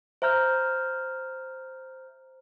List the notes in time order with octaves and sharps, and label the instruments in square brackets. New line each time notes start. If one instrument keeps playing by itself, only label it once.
[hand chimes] C5 E5 A#5 F6 G6